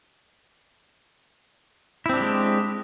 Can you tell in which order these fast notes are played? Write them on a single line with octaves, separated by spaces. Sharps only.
E4 C4 D4 G4 G#3